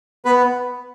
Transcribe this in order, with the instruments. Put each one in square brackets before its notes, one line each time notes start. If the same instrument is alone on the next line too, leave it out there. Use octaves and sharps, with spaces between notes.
[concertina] B3 B4